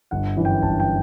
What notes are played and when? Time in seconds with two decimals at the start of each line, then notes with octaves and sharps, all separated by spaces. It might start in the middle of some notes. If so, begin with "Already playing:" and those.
0.11 G1 F#5
0.36 F#2 E3
0.45 G5
0.62 G1 A5
0.80 G5